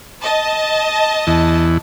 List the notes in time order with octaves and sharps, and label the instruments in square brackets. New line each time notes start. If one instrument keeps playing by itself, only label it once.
[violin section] D#5 A5
[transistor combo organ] E2